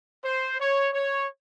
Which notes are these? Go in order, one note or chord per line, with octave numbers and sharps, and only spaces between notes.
C5
C#5
C#5